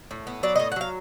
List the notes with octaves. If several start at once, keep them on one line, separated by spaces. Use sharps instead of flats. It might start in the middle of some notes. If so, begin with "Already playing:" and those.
A2
B3
F#3 D5
A2 D#5
F#5
F#3 F5